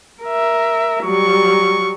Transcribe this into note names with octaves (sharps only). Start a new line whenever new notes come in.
A#4 E5
F#3 G3 C#6